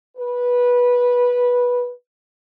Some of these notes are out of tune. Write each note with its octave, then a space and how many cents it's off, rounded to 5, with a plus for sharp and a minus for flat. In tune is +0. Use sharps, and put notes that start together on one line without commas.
B4 -15